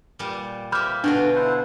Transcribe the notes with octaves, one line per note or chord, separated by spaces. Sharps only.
A#2 G3
A#3 C4 G4 E5 B5 F6 G6
B2 D3 D4 F4 F#4 G5
E4 C5 F#5